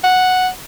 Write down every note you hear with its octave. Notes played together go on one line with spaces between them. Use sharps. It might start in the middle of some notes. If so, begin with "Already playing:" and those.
F#5